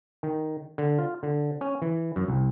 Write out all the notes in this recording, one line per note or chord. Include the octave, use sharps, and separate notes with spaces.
D#3
D3
F4
D3
C#4
E3
F#2
C2